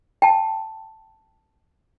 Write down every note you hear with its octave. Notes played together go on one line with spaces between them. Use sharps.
G5 A5